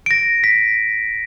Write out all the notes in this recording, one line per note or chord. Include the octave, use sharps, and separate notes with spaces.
A#6 D7
B6